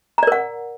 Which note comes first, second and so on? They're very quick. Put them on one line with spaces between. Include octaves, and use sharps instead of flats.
A#5 D5 A#4 F#5